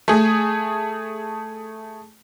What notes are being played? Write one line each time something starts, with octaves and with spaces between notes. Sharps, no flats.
A3 G#4